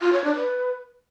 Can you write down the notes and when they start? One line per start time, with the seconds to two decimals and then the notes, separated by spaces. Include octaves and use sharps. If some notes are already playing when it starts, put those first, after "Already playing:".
0.01 F4
0.13 C#5
0.24 D4
0.36 B4